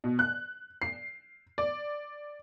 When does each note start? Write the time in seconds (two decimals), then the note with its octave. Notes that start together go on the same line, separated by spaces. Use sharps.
0.04 B2
0.19 F#6
0.82 C7
1.58 D5